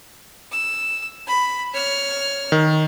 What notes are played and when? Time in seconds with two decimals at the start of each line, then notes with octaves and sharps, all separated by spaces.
0.52 E6
1.27 B5
1.74 C#5 F6
2.52 D#3